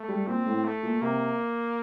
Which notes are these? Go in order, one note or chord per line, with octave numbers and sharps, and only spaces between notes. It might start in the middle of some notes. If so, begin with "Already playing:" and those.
Already playing: A3
G3
A#2 C4
A2
A3
A#2
C3 A#3